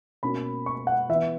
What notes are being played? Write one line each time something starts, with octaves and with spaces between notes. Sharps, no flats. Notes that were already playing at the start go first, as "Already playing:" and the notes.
B2 A#3 C#4 B5
C#6
F#5
E3 B3 E5